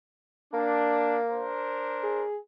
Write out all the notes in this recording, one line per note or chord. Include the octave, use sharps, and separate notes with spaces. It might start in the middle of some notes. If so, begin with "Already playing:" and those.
A#3 D4
D4 A#4 C5
G#4